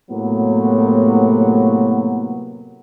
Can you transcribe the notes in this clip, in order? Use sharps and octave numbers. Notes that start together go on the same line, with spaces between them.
A2 C3 F#3 A#3 B3